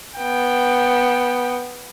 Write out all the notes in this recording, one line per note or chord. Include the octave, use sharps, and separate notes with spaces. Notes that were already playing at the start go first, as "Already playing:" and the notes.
B3 G5